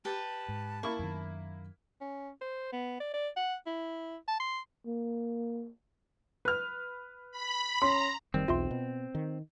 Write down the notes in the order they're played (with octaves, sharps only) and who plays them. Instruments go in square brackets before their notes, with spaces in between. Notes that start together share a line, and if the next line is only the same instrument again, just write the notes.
[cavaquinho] G4 B4 [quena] A5
[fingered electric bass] G#2
[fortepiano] A#3 E4 [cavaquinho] C#6
[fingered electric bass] F#2 D#3
[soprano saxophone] C#4
C5
B3
D5
D5
F#5
E4
A5
C6
[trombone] A#3
[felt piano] B4 F6
[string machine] B5
[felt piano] C#4 [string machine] A#5 [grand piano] C6
[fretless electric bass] F#1 D#3 G3 [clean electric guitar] C4
[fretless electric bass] B1 E2 [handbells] F4 E5 C6
[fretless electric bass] B2
D#3